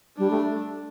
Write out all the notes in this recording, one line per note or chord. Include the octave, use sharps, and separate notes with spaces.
G3 D4
A3